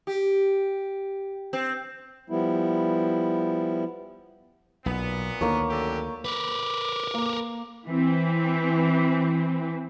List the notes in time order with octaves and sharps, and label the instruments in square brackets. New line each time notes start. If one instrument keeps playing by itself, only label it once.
[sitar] G4
C4
[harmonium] F3 G3 B3 E4
[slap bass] B1 [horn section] A#2 B3
[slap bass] D2 D#3 [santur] A#3 C#5
[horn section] F#2 D3 G4
[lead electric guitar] A#4 B4 [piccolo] D6
[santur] A#3
[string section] E3 C4